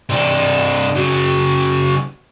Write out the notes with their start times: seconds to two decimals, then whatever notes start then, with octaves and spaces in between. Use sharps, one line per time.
0.09 C3 D4
0.96 C#3 F#3